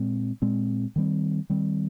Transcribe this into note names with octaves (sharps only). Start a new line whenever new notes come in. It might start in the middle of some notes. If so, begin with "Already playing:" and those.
Already playing: A#2 G#3 C4
A#2 G#3 C4
D#3 G3 C4
D#3 G3 C4